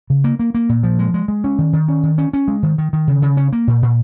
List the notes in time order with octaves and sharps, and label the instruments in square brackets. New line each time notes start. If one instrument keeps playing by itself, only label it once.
[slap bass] C#3
A#3
A#3
A#3
A#2
F3
G#3
G#3
G#3
C#4
D#3
D#3
C#4
D#3
C#4
C#4
G#3
D#3
D#3
D#3
C#3
C#3
C#4
A#3
A#2
A#2